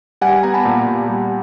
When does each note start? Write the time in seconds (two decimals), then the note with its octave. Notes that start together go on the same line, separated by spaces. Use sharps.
0.21 G3 F#5 G#5
0.43 B3 G#5 A#5
0.54 A5 B5
0.65 A#2
0.87 A#2
1.08 G3